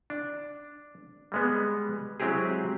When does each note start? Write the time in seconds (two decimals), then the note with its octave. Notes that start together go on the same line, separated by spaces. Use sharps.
0.10 D4
1.32 G3 G#3 B3
2.20 F#3 G#3 C4 E4 G4 G#4